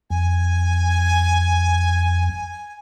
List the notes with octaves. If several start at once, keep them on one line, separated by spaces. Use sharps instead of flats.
F2 G#5